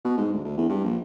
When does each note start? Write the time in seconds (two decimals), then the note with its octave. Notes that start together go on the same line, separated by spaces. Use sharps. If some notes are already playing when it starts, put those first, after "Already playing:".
0.05 B2
0.18 G#2
0.33 D2
0.45 D2
0.57 E2
0.69 G2
0.84 A#1